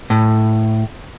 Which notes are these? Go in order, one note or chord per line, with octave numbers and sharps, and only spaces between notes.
A2